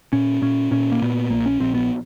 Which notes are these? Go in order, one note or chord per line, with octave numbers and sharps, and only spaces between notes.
A#2 C#4
A#2 C#4
A#2 C#4
A#3
A#2 B3
A#1 A#3
C#4
A#1 C4
B3